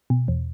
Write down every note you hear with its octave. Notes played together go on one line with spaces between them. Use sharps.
B2
E2